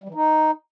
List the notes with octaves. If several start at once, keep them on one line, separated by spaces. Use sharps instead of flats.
G3
E3
D#4